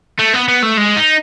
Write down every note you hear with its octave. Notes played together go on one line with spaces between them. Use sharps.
A3
B3
B3
A3
G#3
D#4